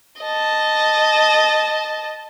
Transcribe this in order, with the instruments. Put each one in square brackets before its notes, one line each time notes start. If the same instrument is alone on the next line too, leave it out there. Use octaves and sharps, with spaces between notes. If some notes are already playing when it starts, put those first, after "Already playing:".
[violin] D#5 A5